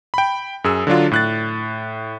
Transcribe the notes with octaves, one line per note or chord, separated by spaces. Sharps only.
G5 B5
F#2 G#4 E6
D3 F#3 D4 F4
A2 F#6 A6